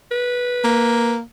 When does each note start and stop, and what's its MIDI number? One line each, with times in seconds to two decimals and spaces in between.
0.11 1.14 71
0.64 1.21 58